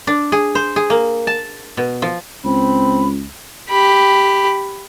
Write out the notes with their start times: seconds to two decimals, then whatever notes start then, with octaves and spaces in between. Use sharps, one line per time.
0.07 D4
0.32 G#4
0.55 C5
0.76 G#4
0.90 A#3
1.27 A5
1.77 B2
2.02 F3
2.45 C#2 C4 B5
3.70 G4 B5